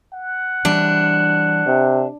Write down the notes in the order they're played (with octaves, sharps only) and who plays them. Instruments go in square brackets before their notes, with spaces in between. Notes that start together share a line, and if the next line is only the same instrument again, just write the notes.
[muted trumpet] F#5
[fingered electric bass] E3 G3 [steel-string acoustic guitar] D4
[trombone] C3